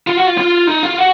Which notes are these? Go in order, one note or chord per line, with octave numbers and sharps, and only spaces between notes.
F4
F#4
F4
F4
D#4
F4
F#4